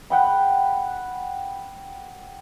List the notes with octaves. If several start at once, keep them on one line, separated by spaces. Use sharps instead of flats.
F#5 G5 B5